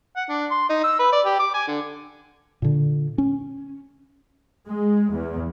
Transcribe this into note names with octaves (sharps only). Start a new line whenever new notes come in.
F#5
D4
C6
D#4
E6
B4
D5
G4
D6
G#5
D3
A#2 D3
C#4
G#3
E2